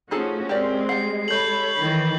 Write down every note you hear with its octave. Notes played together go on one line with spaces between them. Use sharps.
F3 A3 C#4 D#4 F#4 G#4 A4
G#3 C4 C#4 G4 A#4 D5
G3 F#5 C7
A4 C#5 B5 G6 F#7
D#3 E3